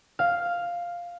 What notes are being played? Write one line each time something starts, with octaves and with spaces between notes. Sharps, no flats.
F5